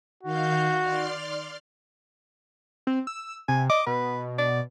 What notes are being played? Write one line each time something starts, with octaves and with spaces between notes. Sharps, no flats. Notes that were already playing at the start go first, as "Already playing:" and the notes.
D#3 F#4 F5 G6
D5 C6 F6
C4
E6
C3 G#5
D#5 D6
B2 B4
D5